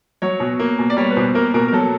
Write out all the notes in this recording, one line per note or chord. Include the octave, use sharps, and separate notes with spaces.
F#3 C#5
B2
A#3
B2
D5
G3 C#5
B4
B2 C5
A#3 A#4
B2 A#4
A#4
F#3 A4